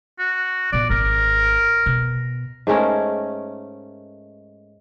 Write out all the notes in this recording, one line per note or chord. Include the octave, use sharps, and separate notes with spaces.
F#4
A#2 B3 D5
G#1 A#4
B2
G#2 A3 C#4 A#4